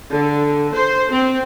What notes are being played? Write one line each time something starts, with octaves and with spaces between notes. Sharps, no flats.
D3
C5
C4